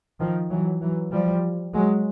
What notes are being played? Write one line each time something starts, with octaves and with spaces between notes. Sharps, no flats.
D#3 F3
E3 F#3
E3 F#3
F3 G3
F#3 G#3